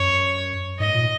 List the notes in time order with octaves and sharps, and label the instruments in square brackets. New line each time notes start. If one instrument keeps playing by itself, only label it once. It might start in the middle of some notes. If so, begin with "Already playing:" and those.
Already playing: [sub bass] F#2 [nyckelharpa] C#5
[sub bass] G#2 [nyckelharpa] D#5
[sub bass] A#2